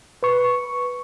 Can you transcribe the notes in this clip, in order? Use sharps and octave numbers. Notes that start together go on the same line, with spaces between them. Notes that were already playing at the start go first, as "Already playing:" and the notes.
B4 C#6